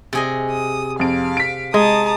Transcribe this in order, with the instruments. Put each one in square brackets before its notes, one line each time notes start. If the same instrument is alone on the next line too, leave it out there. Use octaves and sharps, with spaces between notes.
[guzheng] C3 G#4 D#5
[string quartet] D#6
[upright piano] F2 D7 [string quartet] F5
[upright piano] B6 D7
[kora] G#3 [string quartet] A5 A#5 D#6